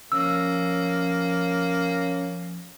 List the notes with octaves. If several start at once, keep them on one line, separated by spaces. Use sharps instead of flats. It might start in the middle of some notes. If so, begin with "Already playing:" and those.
F3 A#3 C#4 E6